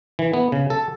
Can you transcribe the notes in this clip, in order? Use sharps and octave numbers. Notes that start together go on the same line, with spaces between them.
E3
B3
C#3
A4